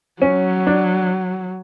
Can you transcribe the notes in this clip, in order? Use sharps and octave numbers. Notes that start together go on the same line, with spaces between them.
F#3 C#4
D4